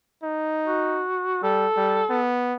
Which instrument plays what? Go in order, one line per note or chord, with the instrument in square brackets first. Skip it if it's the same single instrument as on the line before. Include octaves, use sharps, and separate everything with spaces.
[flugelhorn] D#4
[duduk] F#4
[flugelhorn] G3 [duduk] A4
[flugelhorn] G3
B3